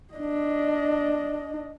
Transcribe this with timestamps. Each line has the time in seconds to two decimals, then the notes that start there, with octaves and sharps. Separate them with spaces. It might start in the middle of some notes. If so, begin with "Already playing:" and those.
0.14 D4 D#5